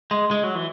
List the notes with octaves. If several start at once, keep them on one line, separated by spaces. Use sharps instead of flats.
G#3
G#3
F#3
E3